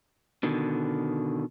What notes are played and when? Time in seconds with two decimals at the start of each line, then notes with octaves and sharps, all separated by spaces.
0.43 B2 D3 D#3